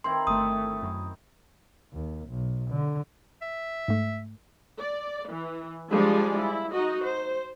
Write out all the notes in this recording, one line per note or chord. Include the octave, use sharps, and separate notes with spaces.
D#3 C4 E4 C6
G1 A3 D#6
F#2
D#2
B1
D3
E5
G#2 A3
D5
E3
F3 G3 G#3 D4 G#4 D5
E4
D#4 F#4 D#5
C5